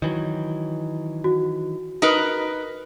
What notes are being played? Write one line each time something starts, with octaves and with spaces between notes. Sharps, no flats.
D#3 E3 F#3
F#4
D#4 A#4 B4